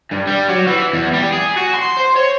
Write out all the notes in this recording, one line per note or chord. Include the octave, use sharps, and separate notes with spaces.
G2
G3
F#3
E3
E2
G3
G#4
F#4
C6
C5
C#5